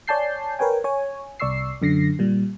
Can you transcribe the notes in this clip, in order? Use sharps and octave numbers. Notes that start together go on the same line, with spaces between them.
C#5 D5 G#5 A5 G6 C7
A#4 B4 C#5 G5 G#5
C#5 G#5
C2 D5 C#6 E6 C7
F#2 D3 A#6 C7
A#2 G3